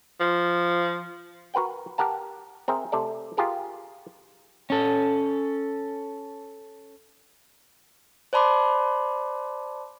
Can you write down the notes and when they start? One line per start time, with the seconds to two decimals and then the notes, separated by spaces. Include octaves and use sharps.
0.20 F3
1.54 F#4 A#4 B4 F#5 G5
1.98 G4 A#4 F#5 A5
2.68 C4 G#4 A#4 E5
2.92 C3 A3 A4 D5
3.37 F4 G4 G#4 A#4
4.70 C#4 A4
8.33 C5 D5 A5 B5 C6 D6